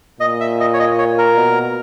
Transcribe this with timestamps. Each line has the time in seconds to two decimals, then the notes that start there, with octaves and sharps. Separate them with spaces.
0.20 A#2 D#5
0.41 E5
0.60 D#5
0.73 C#5
0.80 D#5
0.98 C#5
1.18 A#4
1.37 B2